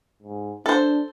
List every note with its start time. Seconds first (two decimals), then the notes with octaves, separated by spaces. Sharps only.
0.23 G#2
0.66 D4 A4 C5